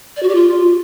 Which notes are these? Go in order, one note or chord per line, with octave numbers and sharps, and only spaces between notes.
D5
F#4
G4
F4